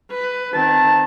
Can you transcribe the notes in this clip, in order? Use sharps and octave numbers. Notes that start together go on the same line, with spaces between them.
B4
D#3 C4 A5